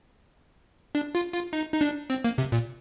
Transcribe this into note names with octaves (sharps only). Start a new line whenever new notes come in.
D4
F4
F4
D#4
D#4
D4
C4
A#3
C3
A#2